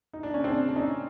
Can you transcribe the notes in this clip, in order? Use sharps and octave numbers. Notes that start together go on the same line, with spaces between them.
D#4
D4
C#4
C4 D4
D4
C#4 D#4